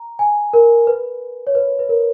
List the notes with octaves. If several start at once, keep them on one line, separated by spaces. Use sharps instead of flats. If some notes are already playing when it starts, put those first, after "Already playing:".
Already playing: A#5
G#5
A#4
B4
C#5
B4
B4
A#4